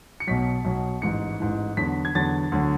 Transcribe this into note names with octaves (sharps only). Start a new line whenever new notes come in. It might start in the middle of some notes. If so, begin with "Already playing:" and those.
C#7
B1 B2 F#3 B6
B1 B2 F#3
A1 G#2 E3 C#7
A1 G#2 E3
E2 D3 F#3 B6
G#6
E2 D3 F#3 A6
D2 D3 F#3